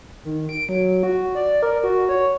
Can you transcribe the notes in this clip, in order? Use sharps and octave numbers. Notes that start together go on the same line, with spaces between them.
D#3
D7
F#3
F#4
D5
A#4
F#4
C#5